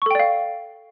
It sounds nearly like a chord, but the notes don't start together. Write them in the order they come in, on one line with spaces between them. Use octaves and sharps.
C#6 A4 G5 D5 F5